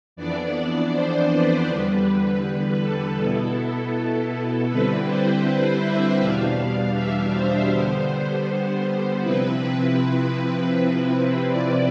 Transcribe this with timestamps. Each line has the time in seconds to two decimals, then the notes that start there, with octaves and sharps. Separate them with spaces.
0.16 F2 E3 B3 D4 D5
0.92 C5
1.30 B4
1.67 E2 D3 G3 B4
2.42 B4
2.80 A4
3.17 B2 B3 E4
4.69 D3 G3 C4 E4 B4
5.07 C5
5.45 C5
5.82 E5
6.19 E2 B2 G3 D4 F5
6.95 E5
7.33 C5
7.70 D3 G3 B3 C5
8.46 C5
9.21 C3 F3 C4 E4 B4
10.73 C3 F3 C4 E4
11.48 D5